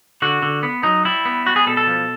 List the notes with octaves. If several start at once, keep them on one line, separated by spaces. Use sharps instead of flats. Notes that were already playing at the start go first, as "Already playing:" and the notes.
D3 F#4
D3
B3
F#3 D#4
G3 E4
B3
G3 F#4
G#4
B2 A4
A4
F3